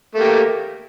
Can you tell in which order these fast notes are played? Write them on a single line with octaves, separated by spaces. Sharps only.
A3 A#3 G4